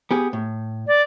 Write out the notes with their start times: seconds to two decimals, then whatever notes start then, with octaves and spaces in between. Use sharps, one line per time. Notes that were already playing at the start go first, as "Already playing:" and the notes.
0.11 B3 G4 G#4
0.33 A2
0.87 D5